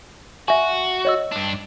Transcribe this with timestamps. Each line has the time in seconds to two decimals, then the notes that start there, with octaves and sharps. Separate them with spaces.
0.48 F#4 E5 G#5
1.05 C#5 D#5 E6
1.32 G2 D4